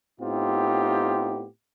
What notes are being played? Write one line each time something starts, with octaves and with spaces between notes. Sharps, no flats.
A2 B3 C4 D#4 F4 G4